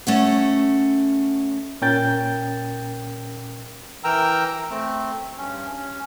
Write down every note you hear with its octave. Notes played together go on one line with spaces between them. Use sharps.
A3 C#4 F#5
A#2 C#4 A#4 G5 G6 A6
E3 A#4 G5 A#5 E6
A3 C4
G2 C#4
C#4